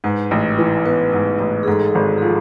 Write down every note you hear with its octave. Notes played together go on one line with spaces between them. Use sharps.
G#2 B4
A1
E3
B3 B4
G#2
A1
G#4
G#2 A4
G#4
G#1
F3 G#4